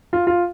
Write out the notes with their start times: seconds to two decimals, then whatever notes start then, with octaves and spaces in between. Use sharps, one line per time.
0.13 F4
0.27 F4